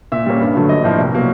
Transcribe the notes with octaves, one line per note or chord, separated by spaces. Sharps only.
A#2 E5
G3 A#3 C#4
G2
D3 F#3 A3
A#1 D#5
A2 F3 A#3
C2
B2 F#3 A#3